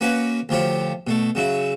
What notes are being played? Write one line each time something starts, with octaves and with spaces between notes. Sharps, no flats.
A#3 C#4 F#4 B4
D2 F3 G4 C#5
B2 A3
C#3 F#3 E4